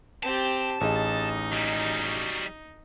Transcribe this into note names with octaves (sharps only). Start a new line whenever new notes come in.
C4 G4 A5
A1 D#4 G#4 D#5
F#3 G3